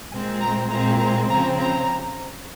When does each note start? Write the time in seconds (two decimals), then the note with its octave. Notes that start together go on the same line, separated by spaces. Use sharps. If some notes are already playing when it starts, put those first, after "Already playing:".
0.12 A#2 G#3 C4 G#5
0.41 A#5
0.70 A#2 G#3 C4 A#5
1.00 A#5
1.29 C#3 F3 C4 A#5
1.58 A#5